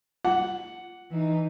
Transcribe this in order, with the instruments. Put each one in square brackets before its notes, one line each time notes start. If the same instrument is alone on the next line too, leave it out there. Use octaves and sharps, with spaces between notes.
[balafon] F4 [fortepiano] F#5
[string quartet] E3 D#4